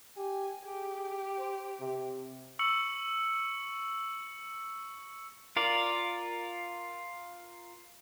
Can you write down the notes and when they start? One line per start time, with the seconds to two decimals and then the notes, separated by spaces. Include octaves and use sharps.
0.17 G4 G#5
0.65 G4 G#4
1.38 C5
1.80 C3
2.59 C#6 E6 C#7 F#7
5.56 F4 A#4 D5